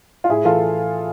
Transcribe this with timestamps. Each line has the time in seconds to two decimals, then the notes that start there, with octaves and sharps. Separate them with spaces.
0.24 F4
0.29 A2 E4 G#4
0.44 E3 F4 A4